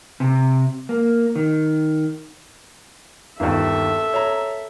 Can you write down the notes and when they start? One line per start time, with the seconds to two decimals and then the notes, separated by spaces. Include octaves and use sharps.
0.20 C3
0.89 A#3
1.36 D#3
3.40 G1 D#2 A4 E5
4.13 C#5 A#5